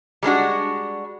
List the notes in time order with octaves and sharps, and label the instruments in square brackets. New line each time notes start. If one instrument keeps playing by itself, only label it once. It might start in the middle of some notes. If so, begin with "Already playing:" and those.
[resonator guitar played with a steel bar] G3 G#3 D4 F#4